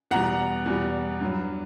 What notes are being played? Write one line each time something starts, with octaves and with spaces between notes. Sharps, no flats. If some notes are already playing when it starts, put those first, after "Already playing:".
E2 B2 G3 F#5 A#5
E2 B2 G3
G2 F#3